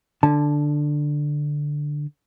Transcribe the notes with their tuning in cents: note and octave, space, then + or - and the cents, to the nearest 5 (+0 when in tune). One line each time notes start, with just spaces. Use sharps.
D3 +5 A5 -10